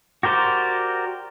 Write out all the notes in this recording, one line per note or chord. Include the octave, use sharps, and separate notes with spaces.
F#4 G4 A#4 C5 D5